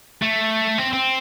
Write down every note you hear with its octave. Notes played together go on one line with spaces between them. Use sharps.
A3
C4
C4